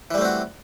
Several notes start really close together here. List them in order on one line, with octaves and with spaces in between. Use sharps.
E3 G3 A3 C4 F#4